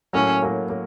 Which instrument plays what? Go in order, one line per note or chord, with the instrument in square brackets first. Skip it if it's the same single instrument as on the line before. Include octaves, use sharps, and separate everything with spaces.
[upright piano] A2 F#3 A#3 [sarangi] C#4
[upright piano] A2 F#3 A#3
A#3